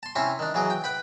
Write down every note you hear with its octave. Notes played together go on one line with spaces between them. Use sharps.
A5 C6
C3 C4 C#4 E4
D#3 D4
E3 F#3 G#4 D6
G5
B4 G5 B5